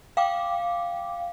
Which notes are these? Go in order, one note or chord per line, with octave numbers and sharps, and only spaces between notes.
F5 G5 D6